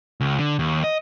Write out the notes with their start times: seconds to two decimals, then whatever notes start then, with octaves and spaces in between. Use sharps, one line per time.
0.20 C#2
0.39 D3
0.59 D#2
0.84 D#5